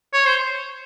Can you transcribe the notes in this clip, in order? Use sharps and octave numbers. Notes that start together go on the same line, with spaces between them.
C#5
C5